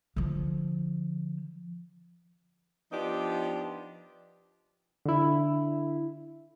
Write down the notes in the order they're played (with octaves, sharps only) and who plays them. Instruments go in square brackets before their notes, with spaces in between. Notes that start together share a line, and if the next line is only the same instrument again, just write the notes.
[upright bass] D3 F3
[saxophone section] F3 B3 D4 D#4 G4
[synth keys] D3 E4